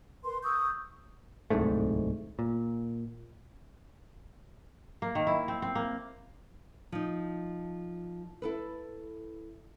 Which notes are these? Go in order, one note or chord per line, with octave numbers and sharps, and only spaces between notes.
A#4 B4 C6
C#6 D#6 E6 G6
D1 C2 G#2 A3
A#2
A#3
D#3
E4
C4
C4
A#3
F3 D#4
E4 A4 B4